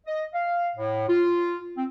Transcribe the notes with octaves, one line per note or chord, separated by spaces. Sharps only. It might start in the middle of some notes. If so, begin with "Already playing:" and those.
D#5
F5
A2
F4
C4